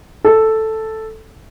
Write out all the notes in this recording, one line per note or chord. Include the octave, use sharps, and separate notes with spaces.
A4